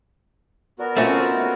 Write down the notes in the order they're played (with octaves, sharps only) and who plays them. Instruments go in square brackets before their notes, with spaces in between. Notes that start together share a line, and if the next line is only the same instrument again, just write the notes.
[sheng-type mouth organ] B3 F#4 A#4 [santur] D5
[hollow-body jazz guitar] A3 C4 C#4 [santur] D#4 F4 C5